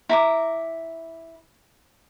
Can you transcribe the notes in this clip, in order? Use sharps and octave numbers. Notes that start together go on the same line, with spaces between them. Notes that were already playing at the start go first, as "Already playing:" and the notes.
E4 A#5 D6